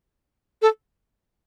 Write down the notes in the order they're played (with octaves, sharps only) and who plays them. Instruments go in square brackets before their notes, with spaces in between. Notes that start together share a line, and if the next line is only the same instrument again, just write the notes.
[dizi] A4